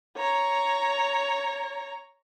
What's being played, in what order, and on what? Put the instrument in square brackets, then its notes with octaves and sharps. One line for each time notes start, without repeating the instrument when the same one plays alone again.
[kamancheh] C#5 A#5